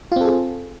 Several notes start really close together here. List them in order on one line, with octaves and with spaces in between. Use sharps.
F4 C4 A4 G#4